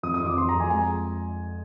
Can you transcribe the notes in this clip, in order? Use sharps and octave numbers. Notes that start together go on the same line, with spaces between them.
F2 D#6
D#6
F2
D6
F2 C6
A#5
F2
G#5
G#3 G#5